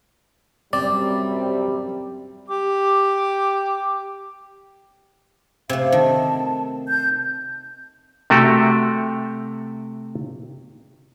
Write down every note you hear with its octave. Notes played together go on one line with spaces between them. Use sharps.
F#2 C3 G3 C4 D5
G4 D6
C3 A3 F5
D#3 A5
G6
C3 A3 F#4 G4